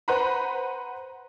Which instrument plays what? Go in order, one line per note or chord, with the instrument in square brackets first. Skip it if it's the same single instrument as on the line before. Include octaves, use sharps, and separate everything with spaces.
[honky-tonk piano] B4 C5 F#5 A#5 B5